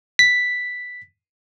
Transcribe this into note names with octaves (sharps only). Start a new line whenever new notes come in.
B6